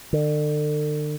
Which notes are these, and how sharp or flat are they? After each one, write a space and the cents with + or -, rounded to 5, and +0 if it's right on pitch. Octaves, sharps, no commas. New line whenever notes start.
D3 +35